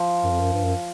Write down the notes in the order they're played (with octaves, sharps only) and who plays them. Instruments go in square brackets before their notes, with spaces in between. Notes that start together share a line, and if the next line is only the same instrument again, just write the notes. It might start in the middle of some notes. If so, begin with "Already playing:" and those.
Already playing: [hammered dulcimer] F3
[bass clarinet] F#2
F2
F#2
G2
F#2